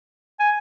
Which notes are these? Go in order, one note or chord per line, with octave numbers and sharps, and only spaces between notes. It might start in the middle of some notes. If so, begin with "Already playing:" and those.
G#5